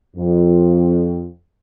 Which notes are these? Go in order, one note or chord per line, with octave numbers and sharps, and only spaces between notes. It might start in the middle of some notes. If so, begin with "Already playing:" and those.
F2